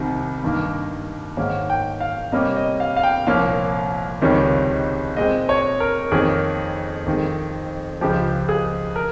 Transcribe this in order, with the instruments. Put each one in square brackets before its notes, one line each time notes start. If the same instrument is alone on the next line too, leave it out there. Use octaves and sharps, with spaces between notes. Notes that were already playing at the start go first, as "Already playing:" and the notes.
Already playing: [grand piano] C2 C3 D#3 G3
G2 D#3 A#3
G#2 D#3 A#3 C#4
G5
F5
C3 G3 A#3 C#4 D#5
D#5
F5
F5
G5
C2 A#2 F3 A#3 C#4 F5
C#2 C3 D#3 G3 C#4
A#2 G#3 C4 D#5
C#5
A#4
F2 D#3 A#3 C#4 G#4
F2 D#3 G#3
C#2 C#3 F3 G4
G#4
A#4